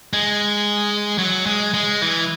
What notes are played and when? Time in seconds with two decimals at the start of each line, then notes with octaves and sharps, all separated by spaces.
0.13 G#3
1.18 F#3
1.46 G#3
1.74 G#3
2.02 E3